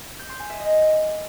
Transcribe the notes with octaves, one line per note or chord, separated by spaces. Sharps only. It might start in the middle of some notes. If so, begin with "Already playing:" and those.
G6
C6
G#5
E5
D#5